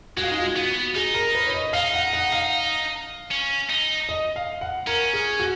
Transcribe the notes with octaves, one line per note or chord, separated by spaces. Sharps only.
G#3 F#4
F4
D#4
F4
B3 F#4
D#4 G#4
A#4
B4
C#5
D#5
D#4 F5
F#5
F#5
F5
C#4
D#4
D#5
F5
F#5
C#4 A#4
G#4
F#4